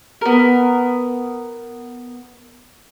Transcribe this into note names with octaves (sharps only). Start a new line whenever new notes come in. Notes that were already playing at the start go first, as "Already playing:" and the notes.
B3 A#4